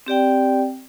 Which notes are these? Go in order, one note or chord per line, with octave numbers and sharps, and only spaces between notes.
C4 G4 D5 G5